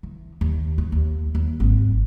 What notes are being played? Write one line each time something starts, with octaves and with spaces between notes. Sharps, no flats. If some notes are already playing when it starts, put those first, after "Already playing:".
E3
D#2
D#3
D#2
D#2
G#1 F#3